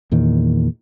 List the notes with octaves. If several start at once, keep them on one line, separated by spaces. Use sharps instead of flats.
E2 A#2 D#3